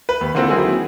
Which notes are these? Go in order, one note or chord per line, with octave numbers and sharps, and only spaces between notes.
B4
D#2
D3 E3 A#3 C4 F4 A4
D#3 F#3 C4 E4 G#4